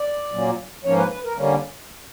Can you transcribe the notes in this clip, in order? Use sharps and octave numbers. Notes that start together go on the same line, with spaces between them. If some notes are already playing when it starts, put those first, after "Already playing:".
Already playing: D5
A#2 F#3 A#3 C#4
G#2 F3 A#3 C#4 C#5
B4
B4
A#4
D3 G3 A#3 C#4